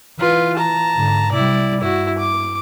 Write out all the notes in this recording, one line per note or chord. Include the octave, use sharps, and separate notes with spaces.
E3 F4 B4
A5 A#5
G#2 D3
C3 G3 E4 D5
G2 E4 F#4
D6